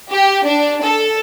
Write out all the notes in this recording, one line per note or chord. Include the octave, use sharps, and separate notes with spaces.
G4
D4
A4